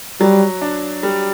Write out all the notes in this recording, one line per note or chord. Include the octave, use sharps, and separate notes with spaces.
F#3 G3
D4
G3